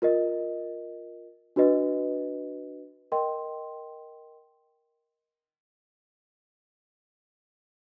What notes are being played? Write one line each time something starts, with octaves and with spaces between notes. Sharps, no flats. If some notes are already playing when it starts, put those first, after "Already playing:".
F4 A#4 D#5
D4 F#4 B4 D#5
A#4 D#5 G5 C6